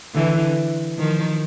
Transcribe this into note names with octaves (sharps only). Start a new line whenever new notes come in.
D3 E3
D#3 F3